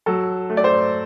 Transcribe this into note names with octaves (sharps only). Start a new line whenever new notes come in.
F#3 A4
A3
D5
C5